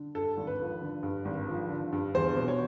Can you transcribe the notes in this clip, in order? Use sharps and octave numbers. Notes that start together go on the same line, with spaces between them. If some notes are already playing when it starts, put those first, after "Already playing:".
Already playing: D3
G2 A4
G#1
B4
F3
D3
G2
G#1
F3
D3
G2
E2 C5
B2
C#5